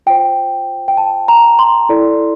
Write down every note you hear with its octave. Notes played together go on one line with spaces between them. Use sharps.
F4 C5 G5
G5
A5
A#5
C6
E4 A4 D5